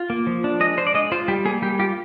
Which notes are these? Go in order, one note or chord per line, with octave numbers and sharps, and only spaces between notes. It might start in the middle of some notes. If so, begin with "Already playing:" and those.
Already playing: F4
A#3
F3
D4
G#3 D#5
D4 C5
D5
G#3 D#5
F4 C5
G3 G4
A#3 G#4
G3 G4
F4 G4